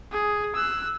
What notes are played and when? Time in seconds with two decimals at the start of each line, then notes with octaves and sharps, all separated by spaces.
0.12 G#4
0.55 E6 F#6